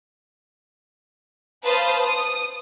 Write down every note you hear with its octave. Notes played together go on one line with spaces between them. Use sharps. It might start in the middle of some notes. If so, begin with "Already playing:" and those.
B4 C5 F5 A5 C6 D#6
D#6